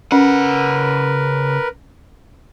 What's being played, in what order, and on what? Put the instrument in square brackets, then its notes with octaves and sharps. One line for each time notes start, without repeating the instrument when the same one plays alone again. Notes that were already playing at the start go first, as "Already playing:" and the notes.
[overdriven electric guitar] C#3 F#5 [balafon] C#4 [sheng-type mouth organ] A#4 B4